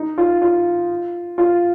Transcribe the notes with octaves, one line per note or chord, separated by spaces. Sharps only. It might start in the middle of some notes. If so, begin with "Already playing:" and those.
Already playing: D#4
F4
F4
F4